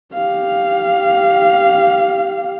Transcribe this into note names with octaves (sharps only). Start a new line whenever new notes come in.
G4 F5